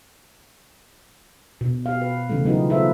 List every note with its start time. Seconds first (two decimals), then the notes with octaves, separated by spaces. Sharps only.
1.61 B2
1.86 G4 F5
2.01 B4
2.29 C#3 E3 G3 A3
2.45 F#3 B3 D#4 F4 G4
2.70 E4 F4 A4 B4 C5 E5